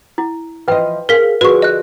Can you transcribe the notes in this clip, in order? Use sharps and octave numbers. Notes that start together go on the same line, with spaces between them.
E4
E3 F3 B4 D#5 G5
G#4 A#4 F5 B6
D3 F3 F#4 G#4 B4 C#6
D#5 F#6